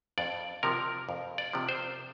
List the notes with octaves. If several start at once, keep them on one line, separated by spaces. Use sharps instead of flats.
F2 D5
C3 F3 A#4
F2
D5
C3 F3
C5